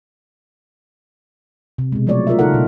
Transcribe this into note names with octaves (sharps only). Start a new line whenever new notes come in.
C3
B2 G#3
F3 F#3 A3 C#5 D5
F4 A#4 D5 E5
C#3 D#4 E4 A4 A#4 F#5
B2 E4